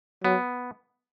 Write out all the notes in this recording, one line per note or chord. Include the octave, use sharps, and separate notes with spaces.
F#3 B3